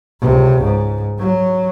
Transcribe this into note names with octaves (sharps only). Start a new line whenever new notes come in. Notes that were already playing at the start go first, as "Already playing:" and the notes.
C#2 C3
G#2
F#3